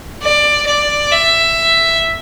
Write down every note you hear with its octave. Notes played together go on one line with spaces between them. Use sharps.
D5
D5
E5